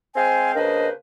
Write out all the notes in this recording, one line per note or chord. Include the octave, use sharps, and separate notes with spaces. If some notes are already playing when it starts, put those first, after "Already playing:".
G#3 C4 C5 F5 G5 G#5
C#3 A#3 D4 B4 C5 D#5